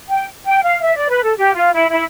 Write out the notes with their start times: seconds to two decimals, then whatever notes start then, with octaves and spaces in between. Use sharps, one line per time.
0.08 G5
0.45 G5
0.63 F5
0.82 E5
0.96 D5
1.09 B4
1.23 A4
1.37 G4
1.55 F4
1.73 E4
1.91 E4